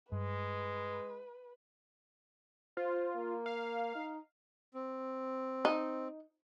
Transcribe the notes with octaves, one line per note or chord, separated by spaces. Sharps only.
G2 G#3 B4
F4 C5
A#3
F5
D#4
C4
D#4